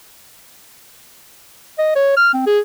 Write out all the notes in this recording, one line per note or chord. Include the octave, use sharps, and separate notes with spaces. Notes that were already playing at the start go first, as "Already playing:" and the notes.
D#5
C#5
F6
C4
G#4